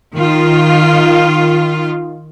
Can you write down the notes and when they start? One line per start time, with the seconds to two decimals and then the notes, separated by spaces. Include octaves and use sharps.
0.16 D#3 F4